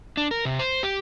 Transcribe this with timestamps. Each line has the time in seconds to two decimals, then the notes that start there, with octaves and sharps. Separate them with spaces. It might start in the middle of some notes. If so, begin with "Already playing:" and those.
0.17 D4
0.31 A#4
0.45 C3
0.59 C5
0.83 G4